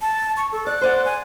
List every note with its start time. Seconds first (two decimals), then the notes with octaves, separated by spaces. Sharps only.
0.01 A5
0.37 C#6
0.52 A4
0.67 D5 F#6
0.81 C5 D5 F#5
1.05 G#5